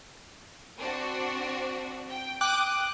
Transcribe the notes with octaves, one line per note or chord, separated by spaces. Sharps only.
C4 D4 F#4
G5
G5 D6 D#6 F#6 D7